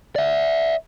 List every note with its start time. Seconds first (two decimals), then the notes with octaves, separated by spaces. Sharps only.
0.16 D5 E5